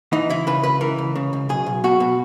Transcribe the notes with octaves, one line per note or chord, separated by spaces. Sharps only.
E3 D#4
C#2 E4
C#3 B4
C#2 B4
E3 A#4
C#2
C#3
C#2
B1 G#4
B1
B2 F#4
B2